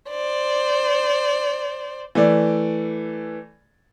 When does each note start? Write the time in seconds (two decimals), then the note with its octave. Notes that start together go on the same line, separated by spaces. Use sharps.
0.10 C5 D5
2.15 E3 A3 D5